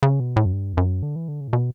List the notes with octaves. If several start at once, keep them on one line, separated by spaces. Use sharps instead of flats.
C#3
B2
A2
F#2
G2
E2
F#2
D3
E3
D3
C#3
A2
B2